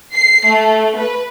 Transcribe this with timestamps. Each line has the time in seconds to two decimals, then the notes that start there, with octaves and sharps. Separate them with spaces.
0.14 C7
0.47 A3
0.97 B4